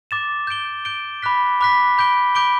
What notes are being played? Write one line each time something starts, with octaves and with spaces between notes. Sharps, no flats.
D6 A6 E7
G6 D7 G7
G6 D7 G7
B5 D6 F#6 B6
B5 D6 F#6 B6
B5 D6 G6 D7 G7
B5 D6 G6 D7 G7